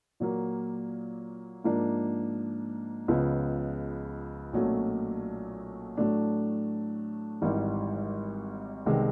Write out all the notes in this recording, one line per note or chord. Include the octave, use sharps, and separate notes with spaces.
A#2 F#3 A#3
G#2 F3 A#3 D4
C#2 C#3 F3 G#3 B3
B1 A#2 F#3 A3 C#4
A2 F#3 A3 D4
G#1 G#2 E3 G3
C2 C3 D#3 G#3 B3